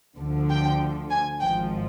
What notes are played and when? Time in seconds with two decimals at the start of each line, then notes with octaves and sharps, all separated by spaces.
0.18 D2 D3 F3
0.50 G5
1.11 G#5
1.40 G#1 G#2 F3 G5